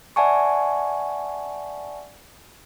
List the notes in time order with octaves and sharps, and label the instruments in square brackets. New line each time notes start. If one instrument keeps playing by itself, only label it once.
[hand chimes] D5 E5 F#5 G#5 A5 C#6